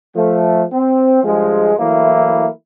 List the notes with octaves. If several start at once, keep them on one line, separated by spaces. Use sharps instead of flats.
F3 A3
C4
G2 F3 G#3
E3 F#3 A3 A#3 E4